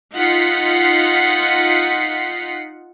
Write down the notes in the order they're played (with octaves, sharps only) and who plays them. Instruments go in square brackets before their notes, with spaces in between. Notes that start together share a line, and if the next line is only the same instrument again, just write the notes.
[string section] D#4 F4 F#5 B6 C7